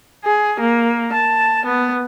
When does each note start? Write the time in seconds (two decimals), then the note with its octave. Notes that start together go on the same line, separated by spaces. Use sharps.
0.24 G#4
0.60 A#3
1.13 A5
1.66 B3